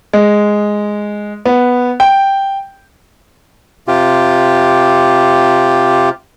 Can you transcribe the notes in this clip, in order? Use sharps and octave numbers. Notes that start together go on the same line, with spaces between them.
G#3
B3
G5
C3 F4 G4